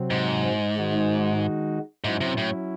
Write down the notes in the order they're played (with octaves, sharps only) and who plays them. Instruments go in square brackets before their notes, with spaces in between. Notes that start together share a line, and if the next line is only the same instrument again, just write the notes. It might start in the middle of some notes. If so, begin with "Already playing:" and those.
Already playing: [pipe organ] C3 F#3 C4
[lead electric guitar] G#2
[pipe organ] D#3 G#3 D#4 F#4
[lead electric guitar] G#2 [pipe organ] F#3 C#4 E4
[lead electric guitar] C3
A2